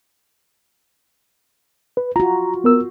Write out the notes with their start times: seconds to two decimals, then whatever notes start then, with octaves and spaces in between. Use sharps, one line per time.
1.97 B4
2.16 F4 F#4 A#5
2.64 B3 A#4 E6